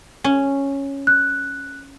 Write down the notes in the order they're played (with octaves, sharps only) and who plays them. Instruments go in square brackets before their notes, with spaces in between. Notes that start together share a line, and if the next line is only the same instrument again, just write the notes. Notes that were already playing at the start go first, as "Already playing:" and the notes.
[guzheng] C#4
[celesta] F#6